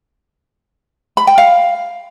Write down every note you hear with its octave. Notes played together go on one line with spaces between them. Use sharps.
B5
G5
F5